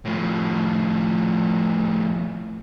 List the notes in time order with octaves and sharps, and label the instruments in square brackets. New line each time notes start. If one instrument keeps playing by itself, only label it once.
[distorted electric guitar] A2 F3